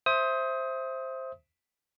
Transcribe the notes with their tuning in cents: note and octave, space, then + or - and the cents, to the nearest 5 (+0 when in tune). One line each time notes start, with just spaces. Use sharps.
C5 +10 E5 +0 D#6 +25